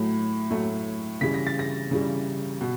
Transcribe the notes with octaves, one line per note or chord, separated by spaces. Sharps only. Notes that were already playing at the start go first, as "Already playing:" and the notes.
Already playing: A2 F#3 A3
A2 F#3 A3
C#3 E3 G3 B6
A#6
A6
A#6
C#3 E3 G3
B2